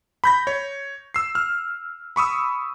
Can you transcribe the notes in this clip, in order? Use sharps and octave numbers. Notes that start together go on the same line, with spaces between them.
B5 G6 A#6
C#5
E6 C7
F6
B5 C#6 D#6 E6